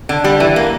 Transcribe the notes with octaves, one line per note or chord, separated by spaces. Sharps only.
D3
G3
E3
A#3